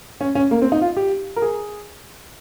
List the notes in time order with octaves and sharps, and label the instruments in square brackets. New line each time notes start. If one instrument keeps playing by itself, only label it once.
[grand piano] C#4
C#4
A#3
C4
D#4
F4
G4
A#4
G#4